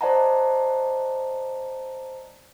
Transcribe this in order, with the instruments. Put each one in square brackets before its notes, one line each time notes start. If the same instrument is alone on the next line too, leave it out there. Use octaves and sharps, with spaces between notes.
[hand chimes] C5 D5 D#5 F#5 A5 A#5